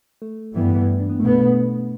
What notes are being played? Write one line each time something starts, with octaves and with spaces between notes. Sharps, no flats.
A3
G2 E3 G3 B3
D4
B3
B2 A3 B3